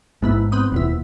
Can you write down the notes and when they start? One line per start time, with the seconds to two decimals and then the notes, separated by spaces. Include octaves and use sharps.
0.22 A1 G#2 B3 E4
0.52 B3 C4 D#6
0.72 D#1 F2 B2 E4